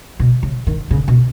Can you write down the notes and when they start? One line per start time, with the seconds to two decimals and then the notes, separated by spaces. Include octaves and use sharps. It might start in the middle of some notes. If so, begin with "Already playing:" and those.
0.19 B2
0.43 C#3
0.67 D#3
0.91 C#3
1.08 B2